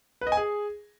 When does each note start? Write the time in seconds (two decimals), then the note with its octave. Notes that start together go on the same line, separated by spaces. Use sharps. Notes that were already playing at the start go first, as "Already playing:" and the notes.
0.21 B4
0.27 D#5
0.32 G#5
0.37 G#4